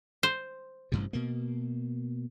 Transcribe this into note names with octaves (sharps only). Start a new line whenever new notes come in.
C5
A1 G2 C3
B2 A#3